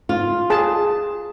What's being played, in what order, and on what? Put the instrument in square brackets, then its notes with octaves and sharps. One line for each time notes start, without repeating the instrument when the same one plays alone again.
[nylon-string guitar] F4
[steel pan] G#4 A5